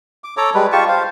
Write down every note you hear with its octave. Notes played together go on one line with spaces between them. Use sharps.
D6
A4 C#5 A#5 D6
G3 G#3 B4
F4 G4 A5 C#6
C5 F5